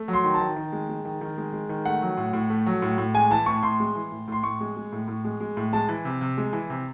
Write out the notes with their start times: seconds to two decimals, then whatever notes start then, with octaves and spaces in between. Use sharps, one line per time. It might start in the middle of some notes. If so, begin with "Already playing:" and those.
Already playing: A3
0.08 F#3
0.13 C6
0.24 D#3
0.34 A5
0.41 D#3
0.56 D#3
0.72 G#3
0.89 G#3
1.05 D#3
1.21 D#3
1.37 G#3
1.53 G#3
1.69 D#3
1.85 A3 F#5
2.02 F#3
2.17 A2
2.33 A2
2.50 A3
2.66 F#3
2.82 A2
2.98 A2
3.14 G#3 G#5
3.30 E3 A5
3.46 A2 C#6
3.63 A2 C6
3.80 G#3
3.96 E3
4.12 A2
4.28 A2 C6
4.43 A2 C#6
4.60 G#3
4.76 G#3
4.92 A2
5.08 A2
5.24 G#3
5.40 G#3
5.57 A2
5.73 G#3 A5
5.89 E3
6.05 C3
6.21 C3
6.37 G#3
6.53 E3
6.70 C3